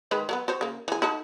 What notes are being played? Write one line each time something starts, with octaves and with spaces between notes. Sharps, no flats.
D#3 G#3 B4
F#3 A#3 B3
F#4 C5 C#5
C#3 A#3
E3 G#4
D#4 F#4 A4